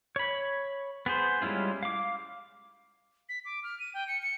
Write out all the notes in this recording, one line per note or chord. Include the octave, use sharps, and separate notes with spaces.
C#5 B5
B3 G#4 C5
G3 G#3 C#4 E4 F4
F5 D6
B6
D6
F6
D#7
G5
C#7
C#7